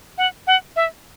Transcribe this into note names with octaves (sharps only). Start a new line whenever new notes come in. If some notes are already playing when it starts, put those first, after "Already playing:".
F#5
F#5
E5